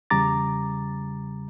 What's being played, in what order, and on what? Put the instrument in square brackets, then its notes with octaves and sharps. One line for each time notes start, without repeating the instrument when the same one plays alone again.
[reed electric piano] E2 C#3 G3 A#5 D6 A6